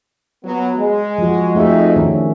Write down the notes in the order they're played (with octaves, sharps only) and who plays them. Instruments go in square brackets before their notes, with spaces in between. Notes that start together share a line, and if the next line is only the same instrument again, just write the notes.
[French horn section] F#3 B3
G#3
[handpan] F3 F#4
[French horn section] F2 D#4 F#4 [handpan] A3 G#4 E5
[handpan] D#3 C#4 D4